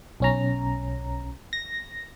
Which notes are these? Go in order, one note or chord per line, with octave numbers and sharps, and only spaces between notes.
B1 C#4 A#5
A#6